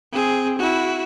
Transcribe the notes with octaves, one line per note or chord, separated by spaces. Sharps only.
C4 G#4
E4 F#4